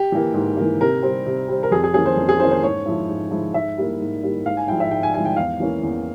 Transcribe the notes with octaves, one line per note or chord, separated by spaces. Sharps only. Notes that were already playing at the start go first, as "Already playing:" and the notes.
Already playing: G4
E3 A#3
G#2
E3 A#3
C3 A#4
G3 C4
C3
G3 C4
A#4
F2 G#4
G#4
E3 A#3 C#4 G#4
C5
F2
G#4
E3 A#3 C#4 C5
C5
G#2 C#5
F3 G#3 E4
G#2
F3 G#3 E4
G#2 E5
G3 A#3 E4
G#2
G3 A#3 E4
G#2 F5
G#5
F3 G#3 E4 G5
E5
G#2 G5
G#5
F3 G#3 E4 G#5
G5
E2 F5
E3 A#3 C#4
E2